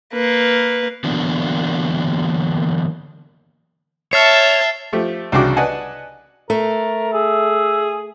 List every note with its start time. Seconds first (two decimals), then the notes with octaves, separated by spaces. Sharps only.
0.13 A#3 B4
1.04 D3 E3 F#3 A#3 B3 D4
4.13 C#5 E5 A5 F6 A6 C7
4.92 F3 A3 G4
5.32 C2 C#3 D4 F#4 G5 D6
5.56 B4 D5 D#5 F#5 G#5 A5
6.50 A3 A#4
7.13 G#4 E5